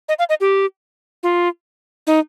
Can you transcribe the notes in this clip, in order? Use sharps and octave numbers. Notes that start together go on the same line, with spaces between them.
D#5
F5
D#5
G4
F4
D#4